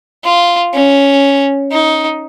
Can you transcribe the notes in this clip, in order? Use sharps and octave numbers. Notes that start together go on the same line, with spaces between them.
F4
C#4
D#4